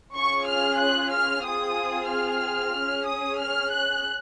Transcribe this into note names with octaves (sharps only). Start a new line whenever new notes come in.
C#4 F4 G#4 C#6
F6
F#6
F6
C4 F4 G#4 D#6
F6
C#4 G#4
D#6
F6
F#6